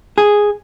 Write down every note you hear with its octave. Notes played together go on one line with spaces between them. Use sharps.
G#4